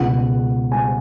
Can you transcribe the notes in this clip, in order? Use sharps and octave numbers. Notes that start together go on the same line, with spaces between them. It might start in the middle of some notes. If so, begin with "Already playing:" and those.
Already playing: C#2 B2 G#3 F#5
G#5